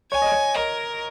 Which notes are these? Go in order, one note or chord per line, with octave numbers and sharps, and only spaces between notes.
C#5 G#5
D#5
C#5
A#4 D#5